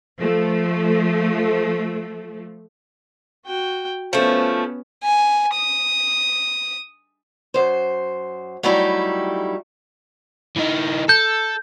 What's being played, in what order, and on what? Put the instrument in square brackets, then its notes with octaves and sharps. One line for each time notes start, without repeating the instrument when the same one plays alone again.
[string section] F3 A3
[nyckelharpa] F#4 G5
[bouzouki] F3 A3 [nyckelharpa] B3 C#4
[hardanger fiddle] G#5
D#6
[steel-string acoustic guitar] F#2 C5
F#3 G3 A3 D#4 E4 G4
[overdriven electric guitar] E3 D#4
[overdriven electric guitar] A4 [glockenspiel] G6